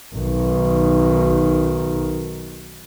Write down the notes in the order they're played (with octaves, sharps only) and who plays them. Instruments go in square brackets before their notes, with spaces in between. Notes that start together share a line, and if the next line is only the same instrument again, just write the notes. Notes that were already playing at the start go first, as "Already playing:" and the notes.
[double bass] B1 D#3